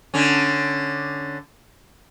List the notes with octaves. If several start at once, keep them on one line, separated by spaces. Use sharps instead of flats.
D3 C#4